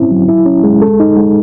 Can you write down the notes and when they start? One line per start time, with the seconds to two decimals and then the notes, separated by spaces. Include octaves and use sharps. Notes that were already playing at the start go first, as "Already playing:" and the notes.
Already playing: C4 C#4 E4
0.11 F#3
0.29 E4
0.46 C#4
0.64 G#3
0.82 A4
1.00 D#4
1.17 G#3